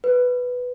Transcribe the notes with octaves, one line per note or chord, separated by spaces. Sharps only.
B4